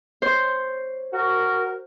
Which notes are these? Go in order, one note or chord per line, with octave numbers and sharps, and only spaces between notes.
C5 C#5
F#4 A#4